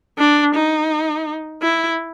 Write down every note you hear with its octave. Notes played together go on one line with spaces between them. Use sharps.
D4
D#4
E4